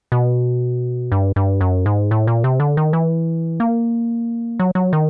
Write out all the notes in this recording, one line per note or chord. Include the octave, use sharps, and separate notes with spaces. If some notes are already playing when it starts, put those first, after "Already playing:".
B2
G2
G2
F#2
G#2
A2
A#2
C3
D3
D#3
E3
A#3
F#3
F#3
D#3